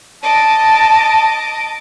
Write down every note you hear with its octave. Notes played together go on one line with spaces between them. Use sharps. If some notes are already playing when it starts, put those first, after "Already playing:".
D#5 A5 D6